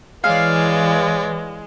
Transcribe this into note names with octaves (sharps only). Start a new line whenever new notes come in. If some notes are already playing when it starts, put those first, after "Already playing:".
E3 G#3 C#5 D5 F5